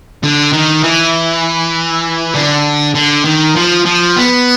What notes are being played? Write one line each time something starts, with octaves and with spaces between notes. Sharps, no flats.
D3
D#3
E3
D3
D3
D#3
F3
F3
B3